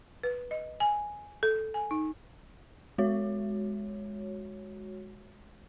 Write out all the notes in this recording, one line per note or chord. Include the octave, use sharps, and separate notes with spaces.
B4
D#5
G#5
A4
G#5
D#4
G#3 F#4 C#5